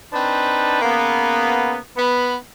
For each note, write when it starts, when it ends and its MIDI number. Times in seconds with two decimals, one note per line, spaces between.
0.13 0.79 60
0.13 0.79 62
0.13 0.79 63
0.13 0.79 71
0.82 1.78 49
0.82 1.78 58
0.82 1.78 59
1.97 2.34 59
1.97 2.34 83